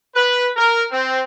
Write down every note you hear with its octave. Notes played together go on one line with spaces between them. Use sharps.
B4
A#4
C4